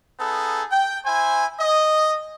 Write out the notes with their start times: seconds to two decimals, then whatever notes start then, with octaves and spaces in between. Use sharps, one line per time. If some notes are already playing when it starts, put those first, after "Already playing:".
0.20 B3 D#4 G#4 A4
0.71 G5
1.06 E4 C5 G#5
1.60 D#5